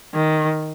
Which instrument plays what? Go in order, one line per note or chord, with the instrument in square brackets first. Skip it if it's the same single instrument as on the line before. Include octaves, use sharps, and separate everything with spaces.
[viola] D#3